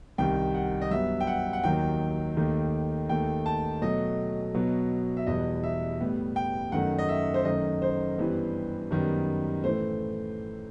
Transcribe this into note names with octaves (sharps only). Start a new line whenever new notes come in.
C2 C3 D#3 G5
F#5
D#5
G2 F#3 B3 E5
G5
F#5
F#5
D#2 D#3 F#3 G5
D#2 D#3 A3
D#2 D#3 A3 G5
A5
B2 F#3 A3 D#5
B2 F#3 B3
E5
E2 B2 G3 B3 D#5
E5
A2 G3 B3
G5
F#2 D#3 A3 F#5
D#5
E5
C5
F#2 D#3 A3 D#5
C5
G2 E3 G3 B3
F#2 D#3 G3 B3
A2 E3 A3 C5